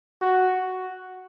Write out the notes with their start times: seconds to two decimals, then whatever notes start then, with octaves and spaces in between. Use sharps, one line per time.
0.22 F#4